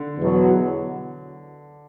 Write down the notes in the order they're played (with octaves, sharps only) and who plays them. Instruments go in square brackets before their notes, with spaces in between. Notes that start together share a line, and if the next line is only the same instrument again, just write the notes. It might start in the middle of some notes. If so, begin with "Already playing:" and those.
Already playing: [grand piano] D3
[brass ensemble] E2 B2 F#3